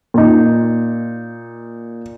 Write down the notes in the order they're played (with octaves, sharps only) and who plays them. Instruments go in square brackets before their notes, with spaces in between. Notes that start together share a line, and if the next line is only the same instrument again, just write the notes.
[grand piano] A#2 D#4